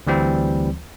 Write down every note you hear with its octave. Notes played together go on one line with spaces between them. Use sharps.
D2 E3 G3 C4